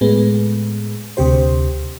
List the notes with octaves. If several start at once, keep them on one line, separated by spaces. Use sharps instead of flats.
A2 G#3 B3
D2 C3 G4 C5